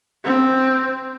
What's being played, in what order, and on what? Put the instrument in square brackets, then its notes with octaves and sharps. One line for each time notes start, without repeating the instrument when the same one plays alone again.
[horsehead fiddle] C4